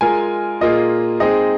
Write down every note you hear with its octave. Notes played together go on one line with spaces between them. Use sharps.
G#3 F4 A#4 G#5
A#2 A#3 F4 G#4 D#5
G#3 C4 D#4 G#4 D#5